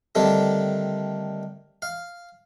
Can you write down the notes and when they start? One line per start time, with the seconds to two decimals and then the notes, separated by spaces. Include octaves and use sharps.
0.15 D3 D#3 G3 A3 C4
1.82 F5